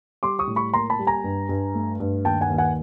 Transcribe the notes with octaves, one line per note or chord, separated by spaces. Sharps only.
G3 C6 D6
C#6 D#6
A2
B5 C#6
A#3 A#5 C6
A5 B5
G3
G#5 A#5
G2
G2
A3
G2
D#2 G5 A5
F#5 G#5
D#2
F#5 G#5